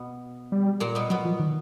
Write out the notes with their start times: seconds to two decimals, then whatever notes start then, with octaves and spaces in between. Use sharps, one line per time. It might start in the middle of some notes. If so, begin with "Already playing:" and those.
Already playing: B2 B3
0.52 G3
0.80 A#2 A#3
0.95 B2 B3
1.10 B2 F#3 B3
1.25 F3
1.39 D#3